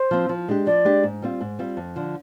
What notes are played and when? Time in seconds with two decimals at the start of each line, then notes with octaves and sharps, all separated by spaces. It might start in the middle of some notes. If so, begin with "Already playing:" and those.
Already playing: C5
0.11 F3 C4
0.29 F3
0.48 G#3 D4 G4
0.66 F3 D5
0.85 G#3 D4 G4
1.03 G#2
1.22 G3 C4 F4
1.41 G#2
1.59 G3 C4 F4
1.77 F2
1.96 D3 F3